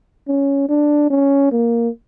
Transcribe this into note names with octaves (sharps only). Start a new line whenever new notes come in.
C#4
D4
C#4
A#3